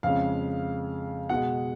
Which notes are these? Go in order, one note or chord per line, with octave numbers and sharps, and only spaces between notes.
F2 C#3 G#3 F5
B2 G#3 F#5